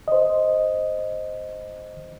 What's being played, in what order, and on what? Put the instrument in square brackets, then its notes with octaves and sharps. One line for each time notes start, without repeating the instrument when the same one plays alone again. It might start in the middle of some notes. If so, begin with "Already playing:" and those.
[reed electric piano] C5 D#5